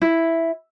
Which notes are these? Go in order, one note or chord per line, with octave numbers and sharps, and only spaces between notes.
E4